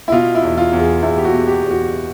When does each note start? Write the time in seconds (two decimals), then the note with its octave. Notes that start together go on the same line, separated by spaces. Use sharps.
0.08 E4
0.12 B2 F4
0.35 E4
0.42 E2
0.57 F4
0.73 E2
0.80 G#4
1.02 E2 E4
1.18 G4
1.25 F#4
1.33 B2
1.48 G4
1.63 E2
1.70 F#4